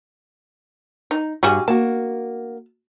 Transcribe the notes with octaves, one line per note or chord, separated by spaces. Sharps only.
D#4
G2 G3 F#4 G#4
A#3 F#4 A5